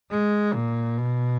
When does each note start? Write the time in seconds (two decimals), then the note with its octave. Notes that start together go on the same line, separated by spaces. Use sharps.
0.10 G#3
0.54 A#2
0.98 B2